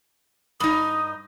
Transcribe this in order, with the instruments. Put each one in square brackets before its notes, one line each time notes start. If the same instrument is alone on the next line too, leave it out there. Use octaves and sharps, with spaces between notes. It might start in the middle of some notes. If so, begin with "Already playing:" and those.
[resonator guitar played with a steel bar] G2 D#4 [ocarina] D#6